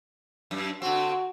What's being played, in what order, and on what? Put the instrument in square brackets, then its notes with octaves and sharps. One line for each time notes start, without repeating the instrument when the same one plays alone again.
[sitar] F#2
[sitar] D3 C4 [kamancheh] F#4